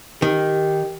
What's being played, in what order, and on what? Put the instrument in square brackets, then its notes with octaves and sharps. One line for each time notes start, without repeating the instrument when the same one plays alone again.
[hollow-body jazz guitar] D#3 [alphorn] G4